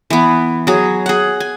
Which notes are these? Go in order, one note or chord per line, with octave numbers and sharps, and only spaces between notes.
E3 B3
F#3 G#4
G#4 F#5
G#5